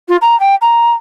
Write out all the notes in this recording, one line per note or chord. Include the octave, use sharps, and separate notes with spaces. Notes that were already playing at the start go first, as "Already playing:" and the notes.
F4
A#5
G5
A#5